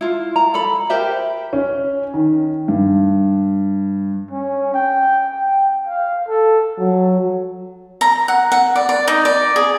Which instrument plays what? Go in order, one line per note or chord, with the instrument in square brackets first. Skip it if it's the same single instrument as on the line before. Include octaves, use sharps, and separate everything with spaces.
[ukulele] E4 F4
A#5
A4 B5
G4 A#4 C5 E5
[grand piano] C#4
D#3
G2
[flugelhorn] C#4
G5
G5
F5
A4
[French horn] F#3
[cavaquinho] A#5
F#5
F#5
D5
D5
D#4
D5
G#4